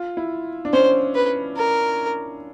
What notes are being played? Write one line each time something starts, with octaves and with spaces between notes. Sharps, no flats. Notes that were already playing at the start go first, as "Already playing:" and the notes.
Already playing: F4
E4
D4
C#4 C5
B4
A#4